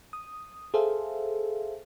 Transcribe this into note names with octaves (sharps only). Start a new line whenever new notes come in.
D#6
G#4 A4 C5 E5 F5